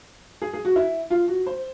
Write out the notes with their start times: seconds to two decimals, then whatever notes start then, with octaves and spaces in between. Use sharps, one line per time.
0.42 G#4
0.53 G#4
0.65 F#4
0.76 E4
1.10 F4
1.28 F#4
1.46 C5